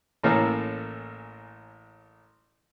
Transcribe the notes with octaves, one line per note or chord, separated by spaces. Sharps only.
A1 A2 A#3 C#4 A4 A#4